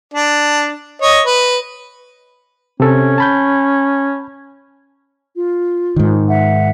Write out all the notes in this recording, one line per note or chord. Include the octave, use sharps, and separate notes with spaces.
D4
C#5 D#5
B4
C3 C#4 A4
A5 B5 G6
F4
G#2 D#3
E5 F#5